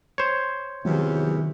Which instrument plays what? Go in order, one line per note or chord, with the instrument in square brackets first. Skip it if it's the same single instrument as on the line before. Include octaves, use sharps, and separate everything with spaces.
[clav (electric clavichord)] C5 C#5
[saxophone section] E2 C3 [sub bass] D#3 [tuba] F#3